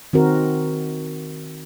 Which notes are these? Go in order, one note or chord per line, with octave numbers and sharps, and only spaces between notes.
D#3 C4 F#4 A#4